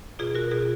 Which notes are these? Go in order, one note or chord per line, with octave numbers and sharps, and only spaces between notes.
B2 F4 G#4
F#4 A#4
B2 F4 G#4